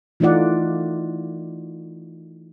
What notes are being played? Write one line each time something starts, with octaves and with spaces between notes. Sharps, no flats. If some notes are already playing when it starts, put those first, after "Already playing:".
E3 A3 D#4 F4 D5 F#5